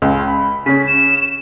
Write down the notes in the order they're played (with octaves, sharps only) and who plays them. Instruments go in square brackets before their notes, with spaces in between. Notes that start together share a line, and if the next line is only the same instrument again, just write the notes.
[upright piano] C#2
B5
[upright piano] C#3 C#4 [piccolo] B6
[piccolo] E7